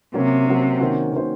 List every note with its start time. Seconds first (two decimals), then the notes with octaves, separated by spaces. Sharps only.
0.14 C3 F#3 A#3 C#4
0.47 F#3 A#3 C#4
0.80 D#3 A#3 C#4 F#4 C5
1.13 D#3 A#3 C#4 F#4 C5